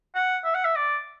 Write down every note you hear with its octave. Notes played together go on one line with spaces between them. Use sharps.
F#5
E5
F#5
E5
D5